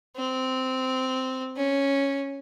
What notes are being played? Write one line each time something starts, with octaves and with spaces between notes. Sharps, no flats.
C4
C#4